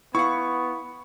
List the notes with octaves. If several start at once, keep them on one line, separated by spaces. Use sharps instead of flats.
B3 E4 F5 F#5 C#6